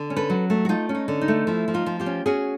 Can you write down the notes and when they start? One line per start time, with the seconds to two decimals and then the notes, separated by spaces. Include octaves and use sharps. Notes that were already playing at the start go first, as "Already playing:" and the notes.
Already playing: D3
0.10 C#4
0.17 A4 B4
0.30 F#3
0.50 A3
0.65 F#4
0.69 A3 D#4 F4
0.89 C#4
0.95 D#4
1.08 D3
1.21 D#4
1.28 A3
1.47 F3 E4
1.68 F3
1.74 D#4 F4
1.86 F3
2.00 F4 G4
2.06 C#4
2.26 C#4 F#4 G#4